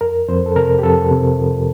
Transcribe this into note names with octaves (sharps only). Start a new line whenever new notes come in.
F2 A#4
F2 C5
A4
C3 A#4
G4
F2 A4
C3
F3